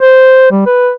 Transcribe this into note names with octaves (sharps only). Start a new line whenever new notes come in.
C5
G3
B4